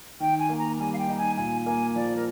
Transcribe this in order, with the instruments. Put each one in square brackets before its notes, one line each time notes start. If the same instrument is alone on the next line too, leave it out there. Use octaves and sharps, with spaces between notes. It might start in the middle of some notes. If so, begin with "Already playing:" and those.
[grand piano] D#3 [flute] G5
[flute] G#5
[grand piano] A#3
[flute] A#5
[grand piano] G3 [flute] G#5
[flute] F5
G5
[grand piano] D#4
[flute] G#5
[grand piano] A#2 [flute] G#5
[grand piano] A#3 [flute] G#5
[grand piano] F3 [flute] D5
[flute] A#4